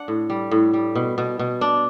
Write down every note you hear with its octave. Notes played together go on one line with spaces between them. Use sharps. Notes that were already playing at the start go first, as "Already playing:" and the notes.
Already playing: D4 F#5
A2
G3
A2
G3
B2
B2
B2
D4